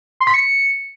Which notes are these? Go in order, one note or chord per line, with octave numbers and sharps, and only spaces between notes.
C6
B6
C#7